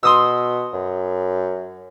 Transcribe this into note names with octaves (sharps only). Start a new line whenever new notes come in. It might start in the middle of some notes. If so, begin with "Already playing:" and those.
B2 C6 D#6 E6
F#2